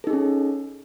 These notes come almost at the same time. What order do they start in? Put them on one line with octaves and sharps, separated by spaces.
A4 D#4 G#4 C#4